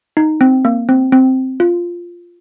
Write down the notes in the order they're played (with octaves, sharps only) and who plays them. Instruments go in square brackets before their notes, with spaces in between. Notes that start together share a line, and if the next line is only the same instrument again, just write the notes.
[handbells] D#4
C4
A#3
C4
C4
F4